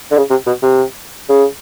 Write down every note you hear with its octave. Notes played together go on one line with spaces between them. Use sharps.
D3
C#3
C3
B2
C3
C#3